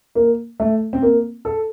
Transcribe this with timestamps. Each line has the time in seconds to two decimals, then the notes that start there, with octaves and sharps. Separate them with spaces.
0.15 A#3
0.60 A3
0.93 C4
1.02 A#3
1.45 A4